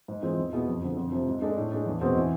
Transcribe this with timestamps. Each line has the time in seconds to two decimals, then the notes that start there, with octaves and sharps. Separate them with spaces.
0.08 G#2
0.22 E3 G#3 C4 F4
0.38 E2
0.53 B2 B3 E4 G#4
0.68 F2
0.82 D3 F3
0.97 F2
1.12 C3 F3
1.27 G#2
1.42 G#3 D4 A4
1.57 A2
1.72 G#3 D4
1.86 E2
2.01 B2 G#3 C4
2.16 E3